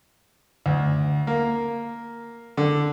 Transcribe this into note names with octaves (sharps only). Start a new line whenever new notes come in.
D2
A#3
D3